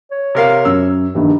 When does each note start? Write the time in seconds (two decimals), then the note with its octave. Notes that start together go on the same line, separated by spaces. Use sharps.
0.12 C#5
0.35 C3 A#4 F5
0.65 F#2 E6
1.14 A#1 G2 D#3